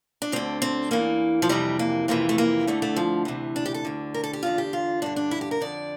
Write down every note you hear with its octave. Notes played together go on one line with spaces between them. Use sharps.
D4
D2 D3 C4
C4
E2 E3 A#3
F3
F2 C3 E3 G3
A#3
F2 C3 E3 A#3
A3
A#3
D2 D3 A3
A3
F3
D2 C3 E3
D4
G4
A4
D2 D3
A#4
A4
G4
E2 D3 F4
G4
F4
G2 D3 D4
D4
E4
G4
A#4
F2 D3 D5